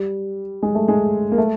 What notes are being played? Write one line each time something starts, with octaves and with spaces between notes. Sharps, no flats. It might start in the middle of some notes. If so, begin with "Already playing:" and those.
Already playing: G3
G#3
A3
G#3
A#3
A3